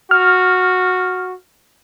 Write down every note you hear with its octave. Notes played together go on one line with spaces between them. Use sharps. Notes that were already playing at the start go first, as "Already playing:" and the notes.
F#4 F6